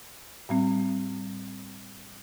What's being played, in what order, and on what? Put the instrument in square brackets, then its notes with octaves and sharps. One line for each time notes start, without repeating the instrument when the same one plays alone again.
[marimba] A2 G3 C4